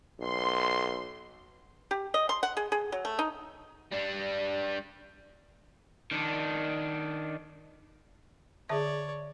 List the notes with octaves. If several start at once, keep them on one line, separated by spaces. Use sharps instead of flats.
B1 C6
G4
D#5
C6
F#5
G#4
G#4
F#3
A3
D#4
G3 D4
D#3 D4
D3 G#4 C#5 D5 E5